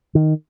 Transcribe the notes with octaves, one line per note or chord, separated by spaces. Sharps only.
D#3